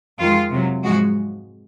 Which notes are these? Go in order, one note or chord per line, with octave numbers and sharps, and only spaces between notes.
F2 D#3 G#3 F4
C3 F#3
G#2 F3 G#3 F#4